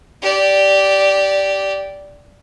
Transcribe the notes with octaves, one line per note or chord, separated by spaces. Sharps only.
G4 D5